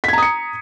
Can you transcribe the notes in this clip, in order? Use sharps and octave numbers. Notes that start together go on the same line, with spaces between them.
A#5 D#6 G#6 B6 C#7